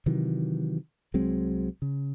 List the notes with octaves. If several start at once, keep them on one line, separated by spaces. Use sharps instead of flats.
C3 D#3 E3 F#3
C2 F#3 G#3 C4
C#3